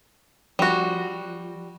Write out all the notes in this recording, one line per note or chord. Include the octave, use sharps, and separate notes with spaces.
F3 G3 F#4